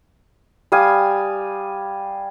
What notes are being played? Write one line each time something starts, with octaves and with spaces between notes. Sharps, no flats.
G3 F5 G#5 D#6